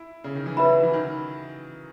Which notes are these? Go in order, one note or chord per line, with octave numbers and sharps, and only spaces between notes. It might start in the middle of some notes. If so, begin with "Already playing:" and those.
Already playing: E4
C#3
D#3
E3
F#3 B4 E5 B5
E3
D#3